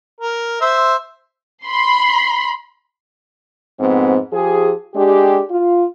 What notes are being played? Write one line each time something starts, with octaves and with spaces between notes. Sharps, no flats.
A#4
C5 E5
B5 C6
F2 G#2 B3 C4
F3 G4 G#4
G#3 D4 G4
F4